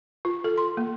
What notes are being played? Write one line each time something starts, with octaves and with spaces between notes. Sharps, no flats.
F4
A4
C6
A#3